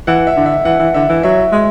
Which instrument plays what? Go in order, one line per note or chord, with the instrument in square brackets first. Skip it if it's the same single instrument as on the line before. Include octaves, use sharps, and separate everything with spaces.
[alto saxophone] E3 [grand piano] F#5
[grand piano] E5
[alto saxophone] D3
[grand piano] E5
[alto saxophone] E3 [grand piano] F#5
[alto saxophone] E3
[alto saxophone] D3 [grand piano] E5
[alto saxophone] E3
[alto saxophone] F#3 [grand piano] E5
[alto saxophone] G#3